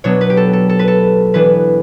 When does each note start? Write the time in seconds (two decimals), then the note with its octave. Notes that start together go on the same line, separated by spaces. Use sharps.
0.04 B2 F#3 B3 D4 C#5
0.21 B4
0.30 G4
0.37 A4
0.53 A4
0.69 A4
0.79 B4
0.88 A4
1.34 E3 B3 D4 B4